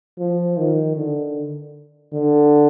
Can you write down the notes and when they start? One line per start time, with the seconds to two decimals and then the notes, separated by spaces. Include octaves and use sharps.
0.18 F3
0.58 D#3
0.96 D3
2.13 D3